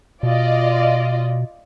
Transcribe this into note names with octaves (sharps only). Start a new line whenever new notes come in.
B2 F4 D5 D#5